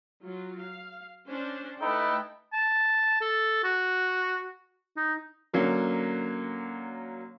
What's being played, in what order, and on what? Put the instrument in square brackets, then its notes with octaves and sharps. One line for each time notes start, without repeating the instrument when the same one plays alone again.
[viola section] F#3 F4
F5
C#4 D4 C5
[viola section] A3 A4 G5 [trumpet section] D#4 E4 B4
[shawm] A5
A4
F#4
D#4
[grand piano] D3 F#3 A#3 C#4